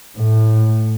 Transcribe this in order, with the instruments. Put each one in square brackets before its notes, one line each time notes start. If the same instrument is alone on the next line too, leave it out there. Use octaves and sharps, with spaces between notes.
[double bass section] A2